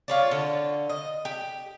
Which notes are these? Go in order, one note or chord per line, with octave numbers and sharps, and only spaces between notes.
F4 C#5 D5
D3
D#5
G4